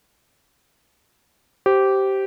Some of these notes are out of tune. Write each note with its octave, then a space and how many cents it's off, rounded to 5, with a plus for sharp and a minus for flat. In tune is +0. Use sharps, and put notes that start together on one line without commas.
G4 -15 C5 +0